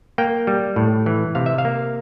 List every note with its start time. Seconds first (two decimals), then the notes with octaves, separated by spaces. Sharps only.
0.18 A#3 G5
0.47 G3
0.76 A2
1.06 E3
1.35 C3 F5
1.46 E5
1.58 F5
1.65 A#3